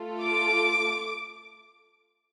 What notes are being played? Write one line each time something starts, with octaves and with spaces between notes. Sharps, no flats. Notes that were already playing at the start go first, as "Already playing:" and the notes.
Already playing: A3 F4 A4
D6